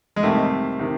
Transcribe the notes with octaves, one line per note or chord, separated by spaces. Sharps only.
G#3
C2 C3 D#3 A3
C3 D#3